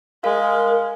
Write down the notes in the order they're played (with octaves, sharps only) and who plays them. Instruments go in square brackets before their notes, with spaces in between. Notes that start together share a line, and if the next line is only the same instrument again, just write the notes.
[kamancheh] G#3 [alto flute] A#4 [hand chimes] F5